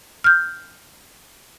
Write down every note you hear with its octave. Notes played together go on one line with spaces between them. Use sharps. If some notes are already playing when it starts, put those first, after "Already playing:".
F6 G6